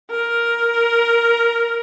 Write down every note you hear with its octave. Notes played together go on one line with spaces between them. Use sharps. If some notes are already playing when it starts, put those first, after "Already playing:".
A#4